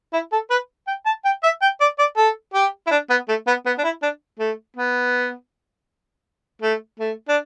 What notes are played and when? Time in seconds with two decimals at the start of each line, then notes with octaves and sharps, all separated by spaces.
0.13 E4
0.32 A4
0.50 B4
0.87 G5
1.05 A5
1.25 G5
1.43 E5
1.62 G5
1.81 D5
1.99 D5
2.17 A4
2.54 G4
2.87 E4
2.91 D4
3.10 B3
3.28 A3
3.47 B3
3.66 B3
3.78 D4
3.84 E4
4.02 D4
4.39 A3
4.76 B3
6.62 A3
7.00 A3
7.28 D4